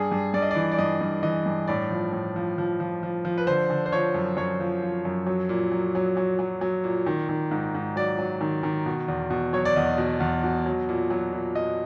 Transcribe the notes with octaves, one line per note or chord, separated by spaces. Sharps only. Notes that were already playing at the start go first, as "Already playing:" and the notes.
Already playing: G2 G#4
G2
G2 D5
D#5
E3 D5
D5
G2 D#5
G2
E3 D#5
G2
A2 D5
F3
A2
F3
F3
F3
F3
F3
B4
D3 C5
D3
C5
F3 C#5
F#2
F#2 C#5
F3
F3
F#2
F#3
A#2
F#3
F#3
F#3
F#3
F#3
A#2
D#3
D#3
G#2
G#2
F#3 D5
F#3
D#3
D#3
B2
E2
B2
F#3 C#5
D5
E2 D#5
B2
E2
B2
F#3
A#2
F#3
A#2
A#2 D#5